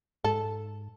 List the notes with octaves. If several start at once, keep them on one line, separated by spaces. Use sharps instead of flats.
G#2 A4